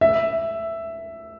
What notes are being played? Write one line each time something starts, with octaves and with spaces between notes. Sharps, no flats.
E5